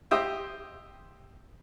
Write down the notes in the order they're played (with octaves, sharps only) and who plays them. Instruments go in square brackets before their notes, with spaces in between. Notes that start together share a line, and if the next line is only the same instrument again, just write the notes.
[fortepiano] G4 C5 D#5 E5 D#6